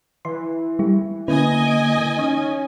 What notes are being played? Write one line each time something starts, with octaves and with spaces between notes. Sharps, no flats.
E3 C6
G3 E4 G4
D3 A#3 C#4 E4 B4 D#5 G#5
D7
C#4 D#4